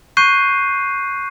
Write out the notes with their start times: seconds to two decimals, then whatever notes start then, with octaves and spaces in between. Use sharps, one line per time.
0.17 C#6 F#6 G6 C7 D#7